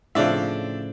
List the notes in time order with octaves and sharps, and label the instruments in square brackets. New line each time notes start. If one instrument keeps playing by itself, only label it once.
[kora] A2 C#3 F3 [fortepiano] C4 D4 E5